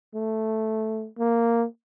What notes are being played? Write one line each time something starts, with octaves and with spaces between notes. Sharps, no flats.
A3
A#3